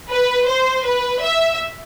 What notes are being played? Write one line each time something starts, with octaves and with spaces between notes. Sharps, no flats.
B4
C5
B4
E5